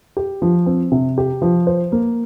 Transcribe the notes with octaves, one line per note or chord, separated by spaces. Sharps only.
G4
F3
C4
C3
G4
F3
C5
A#3